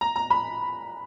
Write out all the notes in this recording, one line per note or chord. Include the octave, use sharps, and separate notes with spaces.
A#5
A#5
B5